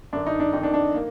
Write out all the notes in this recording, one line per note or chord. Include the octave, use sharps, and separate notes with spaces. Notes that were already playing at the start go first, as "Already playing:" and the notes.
F#2 D3 D4
D#4
D4
F2 D#3 D#4
D4
D4
A#3